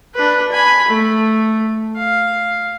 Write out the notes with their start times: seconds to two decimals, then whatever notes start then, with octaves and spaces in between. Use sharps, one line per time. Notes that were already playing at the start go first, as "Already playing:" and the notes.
0.15 D4 B4
0.52 G#5 B5
0.88 A3
1.97 F5